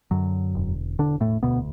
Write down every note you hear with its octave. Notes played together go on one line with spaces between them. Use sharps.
F#2 D3 F#3
E1
E1 D3 D4
A2 A3
D2 B2 B3